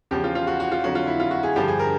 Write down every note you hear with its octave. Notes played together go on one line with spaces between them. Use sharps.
E2 C#3 F3 G4
F4
F4
F#4
F#4
F4
F2 D3 F#3 F#4
F4
E4
F4
F#4
G#4
G2 D3 F3 G4
G#4
A#4